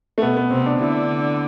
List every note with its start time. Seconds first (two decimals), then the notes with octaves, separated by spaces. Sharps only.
0.18 A3
0.21 B2 B3
0.37 B3
0.51 C3 C4
0.66 D4
0.80 D3 E4